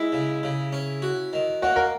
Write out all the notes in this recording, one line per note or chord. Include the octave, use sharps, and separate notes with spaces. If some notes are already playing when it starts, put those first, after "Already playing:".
Already playing: G#3 E4
C#3
C#3
C#4
F#4
D#3
A#3 F#4
A#4